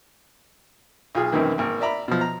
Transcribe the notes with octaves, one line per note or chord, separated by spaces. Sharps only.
B1 F4 G#4
C2 F#2 D#3 E3 A#3
G#1 A#3
D5 E5 A#5 B5
B2 F3
A#5